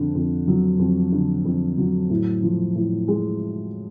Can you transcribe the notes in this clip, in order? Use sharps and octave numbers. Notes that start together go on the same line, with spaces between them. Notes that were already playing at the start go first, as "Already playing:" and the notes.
Already playing: F2 D3
F2
F#3
F2
D3
F2
F#3
A2
F3
A2
G#3